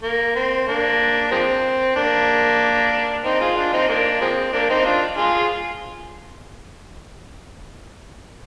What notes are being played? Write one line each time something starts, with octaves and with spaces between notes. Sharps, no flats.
A#3
C4
A#3 D4
F3 G#3 C4
A#3 D4
C4 D#4
F4 G#4
D4 F4
C4 D#4
A#3 D4
F3 G#3 C4
A#3 D4
C4 D#4
D4 F4
F4 G#4